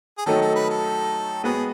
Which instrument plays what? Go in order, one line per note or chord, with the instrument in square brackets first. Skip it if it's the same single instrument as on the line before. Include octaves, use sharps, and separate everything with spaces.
[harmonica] G#4
[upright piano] D#3 F#3 A3 D#4 [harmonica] A4
[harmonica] A4
B4
A4
[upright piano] G#3 B3 F#4 B4 [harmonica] G#4